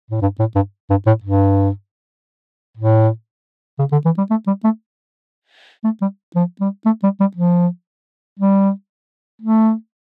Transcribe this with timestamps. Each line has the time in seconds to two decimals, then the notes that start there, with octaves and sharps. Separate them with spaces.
0.10 A2
0.22 G2
0.39 A2
0.55 G2
0.90 G2
1.06 A2
1.23 G2
2.77 A2
3.79 C#3
3.92 D3
4.05 E3
4.18 G3
4.30 A3
4.47 G3
4.64 A3
5.84 A3
6.01 G3
6.35 F3
6.60 G3
6.85 A3
7.03 G3
7.20 G3
7.37 F3
8.39 G3
9.41 A3